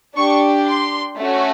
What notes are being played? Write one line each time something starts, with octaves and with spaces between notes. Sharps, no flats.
D4 G4 C#6
C6
A3 C#4 F#4